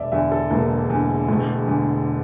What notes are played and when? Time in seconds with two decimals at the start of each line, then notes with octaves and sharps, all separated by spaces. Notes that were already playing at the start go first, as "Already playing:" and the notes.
Already playing: E1 D5 E5
0.12 E2 D3 E5
0.32 A4
0.51 E1 A#3
0.90 E2 D3
1.28 E1 A3
1.67 E2 D3